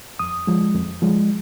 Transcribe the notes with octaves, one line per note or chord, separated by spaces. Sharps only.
F2 D#6
F3 G#3
F2
F3 G#3